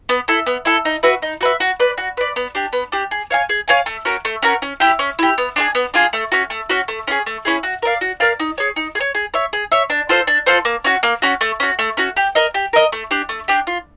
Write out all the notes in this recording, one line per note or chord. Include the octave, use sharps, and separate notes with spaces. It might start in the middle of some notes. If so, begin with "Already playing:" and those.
B3
E4 A4
B3
E4 A4
D#4
F#4 B4 E5
D#4
F#4 B4 E5
F#4
B4 D5
F#4
B4 D5
B3
D4 G4
B3
D4 G4
G#4
C#5 F5 G#5
G#4
C#5 F5 G#5
A3
C#4 F#4 A#4
A3
C#4 F#4 A#4
C#4
E4 G4
C#4
E4 G4
B3
D4 F4 G#4
B3
D4 F4 G#4
A3
C#4 F#4
A3
C#4 F#4
A3
C#4 E4 G#4
A3
C#4 E4 G#4
F#4
A#4 D5 F5
F#4
A#4 D5 F5
D#4
G#4 C#5
D#4
G#4
C#5
G#4
C#5 E5
G#4
C#5 E5
D4
F4 A4 C5
D4
F4 A4 C5
A#3
C#4 F#4
A#3
C#4 F#4
A3
C#4 F#4
A3
C#4 F#4
G4
A#4 D#5
G4
A#4 D#5
A3
D4 G4
A3
D4 G4
F4